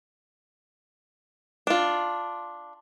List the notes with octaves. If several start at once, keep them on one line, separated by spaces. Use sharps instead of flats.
D4 F4